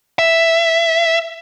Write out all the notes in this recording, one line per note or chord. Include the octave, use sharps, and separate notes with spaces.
E5